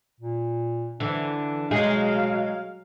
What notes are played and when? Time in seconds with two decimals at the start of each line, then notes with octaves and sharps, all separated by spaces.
0.20 A#2
1.00 D3 E3 D4
1.71 B2 F#3 G#3 D#4 G#4 F5